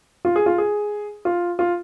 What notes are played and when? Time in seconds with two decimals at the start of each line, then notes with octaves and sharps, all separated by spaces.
0.25 F4
0.36 G#4
0.46 F4
0.58 G#4
1.25 F4
1.59 F4